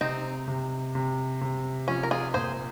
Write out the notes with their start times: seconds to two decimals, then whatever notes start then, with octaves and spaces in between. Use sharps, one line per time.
0.01 C3 C4 D#4
0.48 C3
0.95 C3
1.41 C3
1.88 F3 C#4
2.03 A#4
2.11 F4 G#4
2.34 A#2 G#4 C5